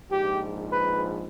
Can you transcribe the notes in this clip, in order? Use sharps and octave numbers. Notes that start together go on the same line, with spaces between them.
A#1 G#2 F3 G4
B4